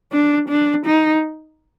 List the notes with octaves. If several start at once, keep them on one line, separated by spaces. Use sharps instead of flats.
D4
D4
D#4